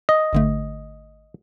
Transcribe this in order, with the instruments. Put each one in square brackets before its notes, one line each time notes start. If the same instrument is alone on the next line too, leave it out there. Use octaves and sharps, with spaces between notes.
[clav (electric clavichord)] D#5
[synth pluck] G#1 D3 A3